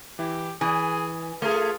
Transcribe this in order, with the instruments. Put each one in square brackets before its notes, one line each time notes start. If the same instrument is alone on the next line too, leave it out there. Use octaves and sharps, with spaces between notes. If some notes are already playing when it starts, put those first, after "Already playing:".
[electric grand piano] E3 E4 [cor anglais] G4
[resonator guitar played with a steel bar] E3 [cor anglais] G#4 [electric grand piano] G#5 D#6
[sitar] A3 G#4 [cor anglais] F4 [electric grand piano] A#4